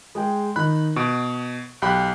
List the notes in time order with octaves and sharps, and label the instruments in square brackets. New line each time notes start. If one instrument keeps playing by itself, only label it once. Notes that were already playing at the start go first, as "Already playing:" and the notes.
[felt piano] G#3 G#4 G5
[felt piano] D#3 D#4 [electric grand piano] B5 F#6
[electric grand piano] B2 [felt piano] C#6 D7
[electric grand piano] B1 G4 B5 [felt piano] F#6